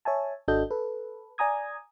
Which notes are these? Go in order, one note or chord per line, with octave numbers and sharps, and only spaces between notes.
C#5 E5 G#5 A5
G#1 D4 F#4 A4 D#5 G6
A4 B4
D5 G#5 A#5 D#6 G#6